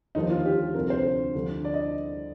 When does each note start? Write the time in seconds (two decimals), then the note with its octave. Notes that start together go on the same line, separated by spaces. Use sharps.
0.15 D#2 D3 F3 D#4
0.31 F4
0.45 G4
0.74 D2 C3 F3 C4 A#4
0.90 C5
1.34 D2 D3 F3
1.65 D5
1.74 D#5